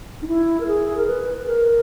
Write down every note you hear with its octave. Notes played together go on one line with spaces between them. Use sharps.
D#4
E4
A#4
G#4
A#4
B4
B4
A#4